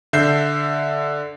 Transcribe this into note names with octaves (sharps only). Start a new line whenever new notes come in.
D3 E5 G6 C7